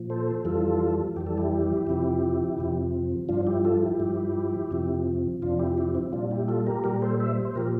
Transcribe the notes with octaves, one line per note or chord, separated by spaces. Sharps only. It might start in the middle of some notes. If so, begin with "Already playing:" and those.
Already playing: A#2 F3
A4 C5
F2 E3 G3 F4 A4
F2 E3 G3 G4
A4
E4 G4
F2 C3 F3
F2 C3 F3
G2 F3 D4 F4
E4 G4
F4 A4
E4 G4
G2 F3
F2 C3 F3
F2 C3 F3 D4 F4
E4 G4
E4 G4
C4 E4
A#2 G3 D4 F4
E4 G4
F4 A4
G4 A#4
A#2 G3 G4 A#4
A4 C5
C5 E5
C5
A#2 F3 G4 A#4